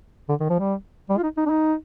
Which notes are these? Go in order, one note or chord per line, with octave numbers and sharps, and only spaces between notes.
D3
D#3
F3
G3
G3
F4
D#4
D#4
D4
D#4